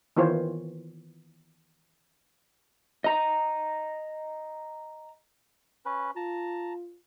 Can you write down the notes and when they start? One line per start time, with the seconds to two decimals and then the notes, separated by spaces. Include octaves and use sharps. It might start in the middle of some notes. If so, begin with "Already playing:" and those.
0.16 D#3 E3 B3 F4 C5 C#5
3.04 D#5 A#5
5.85 C#4 B4
6.16 F4 A5 A#5